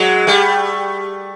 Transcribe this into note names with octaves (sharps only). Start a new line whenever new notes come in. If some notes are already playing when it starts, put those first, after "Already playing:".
Already playing: F#3 G#3
G3 A3